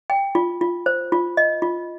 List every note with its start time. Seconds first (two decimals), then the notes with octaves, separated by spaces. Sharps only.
0.10 G5
0.35 F4
0.61 F4
0.86 C5
1.12 F4
1.37 D#5
1.62 F4